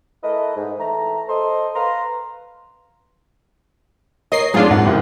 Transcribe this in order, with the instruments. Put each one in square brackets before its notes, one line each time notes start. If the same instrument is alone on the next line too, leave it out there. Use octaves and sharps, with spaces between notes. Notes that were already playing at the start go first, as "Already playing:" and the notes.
[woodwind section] A3 E4 A#4 B4 D#5
G#2
E3 A3 A#5
A4 C5 D#5 C6
B4 F5 A#5 C6
[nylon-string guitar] A#4 C#5 [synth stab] D#5 C7
[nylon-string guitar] F2 A2 D#4 [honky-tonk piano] F#3 [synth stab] D4 F4 G#4
[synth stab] G#2 [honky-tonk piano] F#5
[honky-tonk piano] F#1 E4 G4